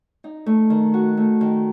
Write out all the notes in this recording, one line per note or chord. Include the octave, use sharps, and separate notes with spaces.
D#4
A3
D#3
F#4
A3
D#3